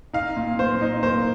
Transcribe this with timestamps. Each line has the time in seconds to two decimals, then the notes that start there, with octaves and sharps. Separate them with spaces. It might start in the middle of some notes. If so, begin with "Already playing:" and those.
0.13 D#4 F5
0.36 A#2
0.59 A#2 C5
0.81 D#4
1.03 A#3 C5